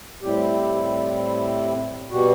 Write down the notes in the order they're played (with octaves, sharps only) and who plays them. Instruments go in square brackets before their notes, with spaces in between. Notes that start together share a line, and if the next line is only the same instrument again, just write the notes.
[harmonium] A2 G3 C4 E4 G4
B2 G3 F#4